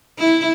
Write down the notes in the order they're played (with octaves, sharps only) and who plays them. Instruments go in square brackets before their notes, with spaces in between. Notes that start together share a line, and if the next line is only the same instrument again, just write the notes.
[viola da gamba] E4